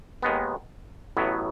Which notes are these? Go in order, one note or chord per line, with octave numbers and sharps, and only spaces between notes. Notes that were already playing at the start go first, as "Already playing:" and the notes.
D#2 D#3 G#3 B3
A1 A2 F#3 B3